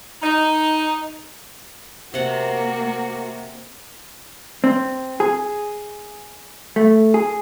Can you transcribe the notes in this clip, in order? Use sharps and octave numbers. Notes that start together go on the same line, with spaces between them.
D#4
C3 A#3 F#4 F#5 A5
C4
G#4
A3
G#4